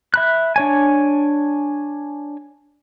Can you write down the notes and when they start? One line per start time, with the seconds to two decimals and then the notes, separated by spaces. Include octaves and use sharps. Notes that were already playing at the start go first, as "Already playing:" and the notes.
0.14 E5 B5 F#6
0.56 D4 C#5 G#5